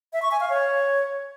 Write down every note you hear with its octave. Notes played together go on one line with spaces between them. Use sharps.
E5
C#6
G#5
F5
C#5